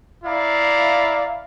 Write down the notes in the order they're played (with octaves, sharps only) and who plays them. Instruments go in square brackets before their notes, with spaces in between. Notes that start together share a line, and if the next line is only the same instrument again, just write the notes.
[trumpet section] E4 D5 F5 A#5